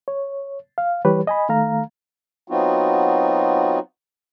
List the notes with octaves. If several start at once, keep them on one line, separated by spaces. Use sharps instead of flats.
C#5
F5
E3 G3 G4 B4 C#5
D#5 G#5 B5
D#3 A3 F5 A#5
F#3 B3 C4 D#4 F4 F#4